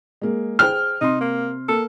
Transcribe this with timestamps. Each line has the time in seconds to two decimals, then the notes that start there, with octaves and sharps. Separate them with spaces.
0.21 G#3 A#3
0.59 G#4 C5 G5 F6
1.01 C3 D#4 C6
1.21 A#3
1.69 A#3 A4